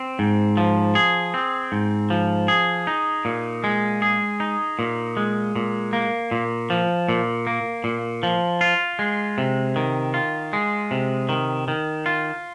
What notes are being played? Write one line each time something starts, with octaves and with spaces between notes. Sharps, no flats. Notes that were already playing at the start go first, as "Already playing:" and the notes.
Already playing: C4
G#2
F3
G#4
C4
G#2
F3
G#4
D#4
A#2
G#3
G#4
D#4
A#2
G#3
A#2
A#3
A#2
F3
A#2
A#3
A#2
F3
F4
G#3
C3
D#3
F4
G#3
C3
D#3
D#3
F4